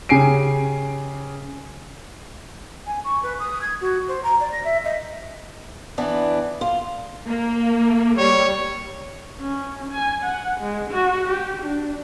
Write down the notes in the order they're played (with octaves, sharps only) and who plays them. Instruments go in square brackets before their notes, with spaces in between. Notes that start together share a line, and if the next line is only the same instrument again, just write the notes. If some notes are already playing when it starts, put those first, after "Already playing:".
[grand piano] C#3 G4 G#5 C7 D7
[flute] G#5
C#6
B4
D#6
G#6
F#4
C5
A#5
D5
A#6
E5
D#5
[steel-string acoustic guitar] E3 B3 D4
F4
[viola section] A#3
[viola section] G3 [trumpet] C#5
[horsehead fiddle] C#4
G#5
F#5
G#3
F#4
G4
D4